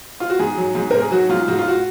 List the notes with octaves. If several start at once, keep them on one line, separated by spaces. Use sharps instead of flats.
F4
F#4
G#2 G#4
F#3
G#2
G#2 A#4
G#4
F#3 F#4
G#2 F4
G#2 F#4
F4
F#4